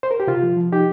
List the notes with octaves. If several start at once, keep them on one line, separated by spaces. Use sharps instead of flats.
C5
A#4
G4
C3 F4
F3
F3
D#4 G4